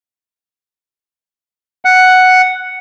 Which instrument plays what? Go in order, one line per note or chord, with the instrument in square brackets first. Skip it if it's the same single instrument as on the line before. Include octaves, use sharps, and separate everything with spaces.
[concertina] F#5